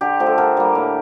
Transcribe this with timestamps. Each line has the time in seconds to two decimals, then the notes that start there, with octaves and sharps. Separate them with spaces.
0.01 D3 G4
0.20 F3 A3
0.26 A4
0.38 D3 A#4
0.57 G3 A#3
0.75 A2